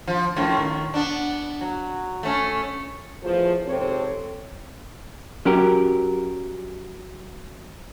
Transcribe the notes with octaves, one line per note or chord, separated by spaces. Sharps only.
F3
F#2 A2 F3
A2 D#3
B3 D4
F#3
A3 C#4
E2 A2 F3
G#2 C3 C4 A4 C#5
F#3 C#4 G4 A#4